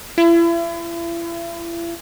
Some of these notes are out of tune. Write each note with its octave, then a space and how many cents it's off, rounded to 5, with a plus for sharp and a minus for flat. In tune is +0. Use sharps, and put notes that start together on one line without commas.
E4 +40